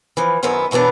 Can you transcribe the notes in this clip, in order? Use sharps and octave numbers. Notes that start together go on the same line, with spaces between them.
E3 F3
F#2 D#3 B3 E4 C5
F#2 B2 E3 B3 D4